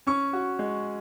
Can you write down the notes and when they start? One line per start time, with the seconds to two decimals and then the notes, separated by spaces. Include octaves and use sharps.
0.07 C#4 C#6
0.33 F#4
0.59 G#3